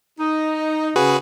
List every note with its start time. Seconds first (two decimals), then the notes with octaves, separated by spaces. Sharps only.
0.20 D#4
0.96 C#3 F#4 G#4 B4